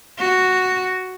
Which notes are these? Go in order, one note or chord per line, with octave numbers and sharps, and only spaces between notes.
F#4